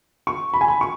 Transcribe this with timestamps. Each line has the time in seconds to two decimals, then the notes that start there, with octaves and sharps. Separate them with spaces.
0.27 C#6
0.54 B5
0.61 G#5
0.68 B5
0.81 C#6